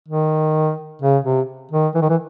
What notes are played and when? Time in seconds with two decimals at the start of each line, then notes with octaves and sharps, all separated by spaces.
0.08 D#3
1.02 C#3
1.24 C3
1.71 D#3
1.94 E3
2.01 D#3
2.09 E3